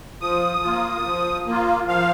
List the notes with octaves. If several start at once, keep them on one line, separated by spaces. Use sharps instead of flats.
F3 D#6
A#3 F4
F3
A#3 F4
F3 F5